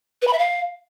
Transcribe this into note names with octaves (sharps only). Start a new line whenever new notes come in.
B4
B5
E5
F5